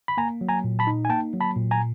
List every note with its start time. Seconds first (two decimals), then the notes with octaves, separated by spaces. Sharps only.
0.08 B5
0.17 A#3 G#5 A#5
0.41 F#3
0.49 G#5 A#5
0.64 A#2
0.79 A5 B5
0.87 D#4
1.05 G#5
1.10 A#3 G5 A5
1.33 F#3
1.41 A5 B5
1.56 A#2
1.71 G#5 A#5